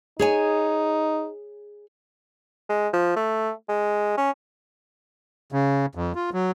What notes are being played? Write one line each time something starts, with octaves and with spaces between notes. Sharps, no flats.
D#4 G#4 C#5 G#5
G#3
F3
A3
G#3
C#4
C#3
F2
F4
F#3